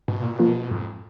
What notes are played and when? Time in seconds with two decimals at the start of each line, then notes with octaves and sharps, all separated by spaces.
0.08 G#2 B2
0.22 A#2
0.35 B2 F3 A#3 F4 A#4
0.71 F2 G#2